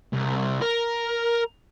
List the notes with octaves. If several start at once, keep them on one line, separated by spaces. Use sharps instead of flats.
C2
A#4